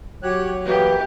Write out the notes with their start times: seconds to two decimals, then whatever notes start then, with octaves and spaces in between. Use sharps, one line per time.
0.23 F#3 G4 C#5 F#6
0.65 E3 A#3 B3 G4